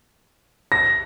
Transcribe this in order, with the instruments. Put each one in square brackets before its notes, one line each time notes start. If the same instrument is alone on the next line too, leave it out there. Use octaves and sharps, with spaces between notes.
[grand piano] A#6